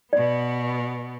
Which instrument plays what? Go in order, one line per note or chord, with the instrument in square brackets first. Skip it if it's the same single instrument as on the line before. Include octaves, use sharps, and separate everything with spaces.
[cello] B2 B3 [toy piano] D5